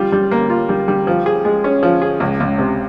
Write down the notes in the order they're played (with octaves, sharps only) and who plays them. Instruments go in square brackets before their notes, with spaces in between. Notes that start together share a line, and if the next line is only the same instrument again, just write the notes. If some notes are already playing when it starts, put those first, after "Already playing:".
Already playing: [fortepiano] G3 F4
G3
A#3
F4
G3
G3
F3
G#4
G#3
C#4
F3
G#4
C#2
C#2
C3